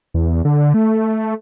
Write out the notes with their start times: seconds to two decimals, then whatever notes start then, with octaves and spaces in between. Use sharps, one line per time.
0.14 E2
0.45 D3
0.74 A3